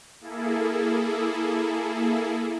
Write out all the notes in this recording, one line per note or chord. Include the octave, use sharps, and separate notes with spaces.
A#3 E4 G#4 A4